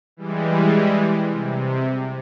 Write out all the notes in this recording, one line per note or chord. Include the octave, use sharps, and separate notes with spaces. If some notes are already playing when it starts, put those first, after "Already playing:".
E3 G3 G#3
C3